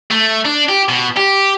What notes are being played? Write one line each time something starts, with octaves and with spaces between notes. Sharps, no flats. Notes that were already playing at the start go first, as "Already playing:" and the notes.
A3
D4
G4
B2
G4